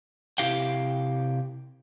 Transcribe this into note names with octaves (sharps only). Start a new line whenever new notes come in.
C3 A#3 E4 G4 F5 G5